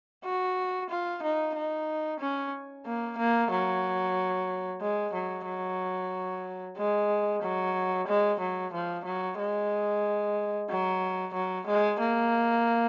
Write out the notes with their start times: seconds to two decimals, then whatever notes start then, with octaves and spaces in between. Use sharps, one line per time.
0.24 F#4
0.90 F4
1.23 D#4
1.55 D#4
2.20 C#4
2.86 A#3
3.18 A#3
3.51 F#3
4.81 G#3
5.14 F#3
5.47 F#3
6.77 G#3
7.43 F#3
8.08 G#3
8.40 F#3
8.74 F3
9.05 F#3
9.39 G#3
10.70 F#3
11.34 F#3
11.67 G#3
12.00 A#3